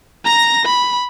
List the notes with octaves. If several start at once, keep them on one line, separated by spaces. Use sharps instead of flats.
A#5 A#6
B5